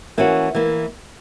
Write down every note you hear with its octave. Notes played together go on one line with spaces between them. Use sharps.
E3 A#3 C#4 F#4
E3 A#3